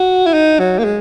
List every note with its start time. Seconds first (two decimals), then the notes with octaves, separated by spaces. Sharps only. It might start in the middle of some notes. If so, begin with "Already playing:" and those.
Already playing: F#4
0.26 E4
0.34 D#4
0.59 F#3
0.79 A#3
0.84 G#3